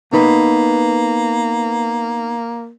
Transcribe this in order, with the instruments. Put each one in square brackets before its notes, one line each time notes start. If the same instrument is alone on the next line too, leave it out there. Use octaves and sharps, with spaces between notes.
[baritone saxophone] A#3 [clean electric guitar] B3 D#4 B4